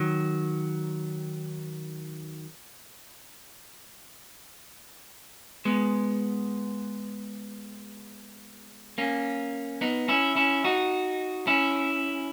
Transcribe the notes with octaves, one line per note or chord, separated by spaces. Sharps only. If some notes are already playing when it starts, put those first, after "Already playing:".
Already playing: D#3 F#3
G#3 B3
A#3 C#4
B3 D#4
C#4 E4
C#4 E4
D#4 F#4
C#4 E4